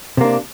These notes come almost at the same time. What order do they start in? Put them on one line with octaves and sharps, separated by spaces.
C3 A#3 D4